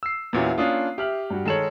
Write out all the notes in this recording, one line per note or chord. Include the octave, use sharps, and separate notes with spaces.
E6 C7
E2 A#2 B3 C#4 E4 F#4
A#3 C#4 D4 F4 D#6 C7
G4 E5 F6 F#7
G2 F#4
D#3 G#3 A4 C#5 E7 F#7